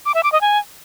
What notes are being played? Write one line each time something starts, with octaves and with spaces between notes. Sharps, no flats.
D6
E5
D6
D#5
G#5